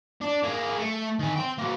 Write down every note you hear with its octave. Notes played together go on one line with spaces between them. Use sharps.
D4
A#3 G#4
A3
D#3 G#5
G5 C6
A#3 F#4